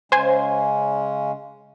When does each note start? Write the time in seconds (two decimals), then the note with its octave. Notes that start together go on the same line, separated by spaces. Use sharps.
0.12 C#3 G#3 C#4 C5 G#5